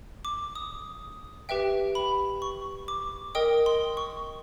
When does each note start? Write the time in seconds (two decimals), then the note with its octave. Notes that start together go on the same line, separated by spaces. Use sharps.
0.25 D6
0.55 D#6
1.49 G4 B4 E5 G5
1.95 B5
2.42 C#6
2.88 D6
3.35 A#4 D#5 G5 D#6
3.66 C6
3.97 C#6